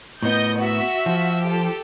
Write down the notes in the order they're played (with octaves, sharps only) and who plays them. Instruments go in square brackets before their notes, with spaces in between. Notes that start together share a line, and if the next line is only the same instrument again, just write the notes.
[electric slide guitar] A2 B3 [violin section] D#5 G6
[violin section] F#4 E5
[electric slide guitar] F3
[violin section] G4 A4